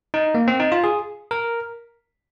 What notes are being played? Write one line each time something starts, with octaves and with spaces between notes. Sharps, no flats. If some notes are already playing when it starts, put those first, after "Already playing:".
D#4
A#3
C4
D#4
F4
G#4
A#4